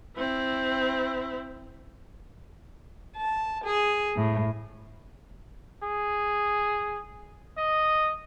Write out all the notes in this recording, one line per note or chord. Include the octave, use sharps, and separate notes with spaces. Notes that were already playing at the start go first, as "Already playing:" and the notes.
C4 E4
A5
G#4
A2
G#4
D#5